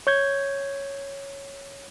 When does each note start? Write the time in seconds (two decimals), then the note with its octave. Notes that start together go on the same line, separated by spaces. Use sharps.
0.07 C#5 G6 G#6